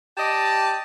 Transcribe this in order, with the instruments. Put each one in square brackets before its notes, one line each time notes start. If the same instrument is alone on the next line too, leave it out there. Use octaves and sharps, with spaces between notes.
[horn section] G4 D5 D#5 A5